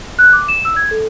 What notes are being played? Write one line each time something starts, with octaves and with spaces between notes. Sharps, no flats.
F#6
D6
E7
E6
G#6
A4